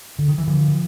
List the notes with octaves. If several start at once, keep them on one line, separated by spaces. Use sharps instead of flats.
D3
D#3
E3
D3 F3